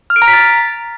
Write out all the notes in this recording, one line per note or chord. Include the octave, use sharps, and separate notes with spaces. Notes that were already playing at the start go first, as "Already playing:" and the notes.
F6
D7
A#5
B6
A6